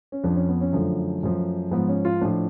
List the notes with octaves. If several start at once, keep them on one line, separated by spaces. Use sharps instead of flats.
C#4
F2 F3 D4
C#4
B3
C#4
F#2 D3 F3 A3
F#2 F3
G#2 F3 B3
C#4
F4
A2 F3 D4